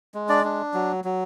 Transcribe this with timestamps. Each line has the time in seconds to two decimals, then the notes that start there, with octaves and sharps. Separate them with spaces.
0.14 G#3
0.29 D4 D5
0.44 D4
0.74 F#3
1.04 F#3